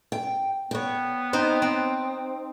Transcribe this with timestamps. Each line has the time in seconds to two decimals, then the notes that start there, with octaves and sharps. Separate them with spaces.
0.12 G5
0.71 B3 C#5 G5
1.33 C4 D#4 C5
1.62 C4